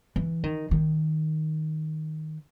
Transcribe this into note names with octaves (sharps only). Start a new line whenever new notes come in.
E3
D#3
D#3